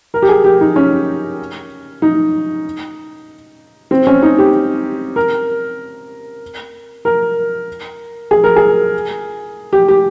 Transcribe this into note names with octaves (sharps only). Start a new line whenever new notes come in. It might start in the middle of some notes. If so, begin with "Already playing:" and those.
A#4
G4
G#4
G4
D#4
C#4
D#4
C4
C#4
D#4
G4
A#4
A#4
G#4
A#4
G#4
G4
G4